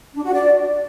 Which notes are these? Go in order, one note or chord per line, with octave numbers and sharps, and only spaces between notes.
D4
F#4
D5